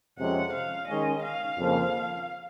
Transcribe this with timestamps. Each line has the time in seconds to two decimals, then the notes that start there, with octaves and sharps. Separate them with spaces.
0.19 F2 C3 F3 G#3 C#4 F#5
0.54 F5
0.88 D#3 G#3 C#4 D#5
1.23 F5
1.57 F2 C#3 F3 A#3